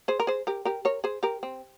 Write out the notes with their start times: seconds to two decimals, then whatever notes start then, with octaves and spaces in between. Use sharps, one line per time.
0.08 G#4 C5
0.20 A#4
0.27 G#4 C5
0.47 G4 A#4
0.65 G4 A#4
0.85 A#4 C#5
1.04 G#4 C5
1.23 G4 A#4
1.43 C4